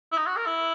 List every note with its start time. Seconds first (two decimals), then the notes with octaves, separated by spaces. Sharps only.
0.12 E4
0.17 D#4
0.26 F#4
0.36 A#4
0.46 E4